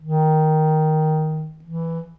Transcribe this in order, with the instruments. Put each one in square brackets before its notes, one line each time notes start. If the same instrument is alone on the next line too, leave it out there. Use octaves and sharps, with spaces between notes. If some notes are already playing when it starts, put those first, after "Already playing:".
[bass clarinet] D#3
E3